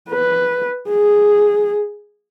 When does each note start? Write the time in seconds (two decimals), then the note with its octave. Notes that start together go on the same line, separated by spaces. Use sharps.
0.11 B4
0.88 G#4